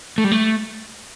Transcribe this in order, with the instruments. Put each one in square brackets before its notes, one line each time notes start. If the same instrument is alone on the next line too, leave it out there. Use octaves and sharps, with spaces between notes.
[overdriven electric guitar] A3
G3
A3